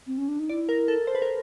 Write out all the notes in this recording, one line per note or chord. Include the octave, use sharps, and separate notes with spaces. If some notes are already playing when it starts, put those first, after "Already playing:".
C4
C#4
D4
D#4
E4 D5
A#4
A4
C5
B4
A#4